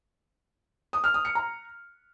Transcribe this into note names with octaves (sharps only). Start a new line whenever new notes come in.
D#6
F6
D#6
C#7
A#5